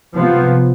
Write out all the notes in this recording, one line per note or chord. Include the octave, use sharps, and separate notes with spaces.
C3 F3 B3